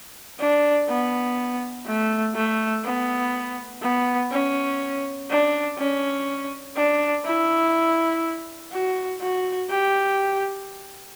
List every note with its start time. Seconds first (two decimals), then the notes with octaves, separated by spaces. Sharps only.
0.39 D4
0.89 B3
1.86 A3
2.35 A3
2.84 B3
3.82 B3
4.31 C#4
5.30 D4
5.78 C#4
6.76 D4
7.25 E4
8.72 F#4
9.21 F#4
9.70 G4